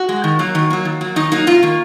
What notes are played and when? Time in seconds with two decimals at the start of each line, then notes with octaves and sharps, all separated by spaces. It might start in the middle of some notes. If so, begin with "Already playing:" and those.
Already playing: F#4
0.09 G#3
0.24 D#3
0.39 F#3 A#3
0.55 D#3
0.70 F#3 A#3
0.85 D#3
1.01 F#3 A#3
1.16 D#3 D#4
1.32 F#3 A#3 D#4
1.47 C3 F4
1.63 D#3 A#3